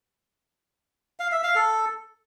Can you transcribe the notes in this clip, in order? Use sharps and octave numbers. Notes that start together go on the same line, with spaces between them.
F5
E5
F5
A4